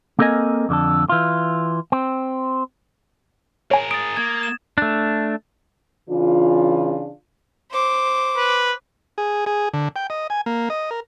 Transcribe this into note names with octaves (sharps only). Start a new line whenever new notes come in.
A#3 C4 A4 A#4 D#5 G#5
F2 D3 F#4 A4
E3 F4
C4
G#4 A#4 C#5 G#5
D#6 A6 D7
A#3 G#6
E7
A3 D4
C#3 E3 D4 F4
C5 D6
B4
G#4
G#4
D3
G5
D#5
G#5
A#3
D#5
A#4